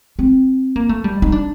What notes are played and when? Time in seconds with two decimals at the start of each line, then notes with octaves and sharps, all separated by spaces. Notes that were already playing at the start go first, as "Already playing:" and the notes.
0.19 C4
0.76 A#3
0.89 A3
1.04 G3
1.22 D#4
1.32 D4